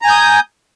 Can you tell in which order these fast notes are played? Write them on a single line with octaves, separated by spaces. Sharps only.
A#5 G#5 G6 D#6